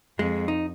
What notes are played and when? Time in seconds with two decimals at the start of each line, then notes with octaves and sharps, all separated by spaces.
0.19 F2 G#3
0.48 D#4